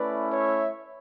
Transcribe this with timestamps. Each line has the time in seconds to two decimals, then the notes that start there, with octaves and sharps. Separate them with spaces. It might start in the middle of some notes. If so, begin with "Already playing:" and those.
Already playing: A3 C#4 E4 B4 D5
0.32 C#5 E5